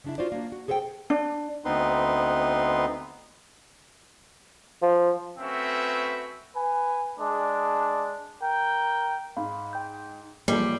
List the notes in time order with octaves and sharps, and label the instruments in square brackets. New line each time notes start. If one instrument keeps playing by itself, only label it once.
[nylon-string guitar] C#3 D4 E4
F4 F#4 C5 D5
A#3 D4
F#4
G#4 A4 C5 D#5 G5
[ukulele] D4
[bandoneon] D2 B3 C4 D#4 B4 C6
[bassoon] F3
[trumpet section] A3 C4 C#4 F#4 B4 E5
B4 G#5
G#3 D4
A#4 G5
[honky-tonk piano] G#2 [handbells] F5 B5
[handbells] G5 G6
[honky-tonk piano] A1 F3 G#3 [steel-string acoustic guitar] G3 [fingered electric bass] A#3 [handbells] C7